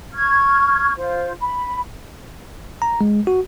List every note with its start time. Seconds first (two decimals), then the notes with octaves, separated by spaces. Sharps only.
0.14 C#6 F6 G#6
0.97 F4 C5
1.40 B5
2.82 A#5
3.01 G#3
3.27 F#4